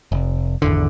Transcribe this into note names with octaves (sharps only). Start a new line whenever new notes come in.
F1
G#1 E2 D3